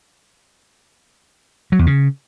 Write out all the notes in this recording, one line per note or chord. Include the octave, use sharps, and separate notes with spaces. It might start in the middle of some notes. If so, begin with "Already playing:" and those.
F#3
E2
C#3